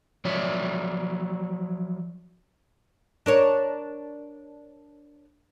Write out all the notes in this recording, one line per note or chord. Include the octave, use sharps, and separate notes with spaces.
F3 F#3 C#5 D5 E5
D4 A#4 C#5